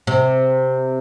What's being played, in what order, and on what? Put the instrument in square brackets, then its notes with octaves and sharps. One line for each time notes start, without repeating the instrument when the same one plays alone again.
[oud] C3